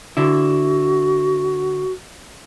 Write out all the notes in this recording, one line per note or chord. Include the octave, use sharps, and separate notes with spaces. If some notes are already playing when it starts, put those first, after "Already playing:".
D3 E4 F#4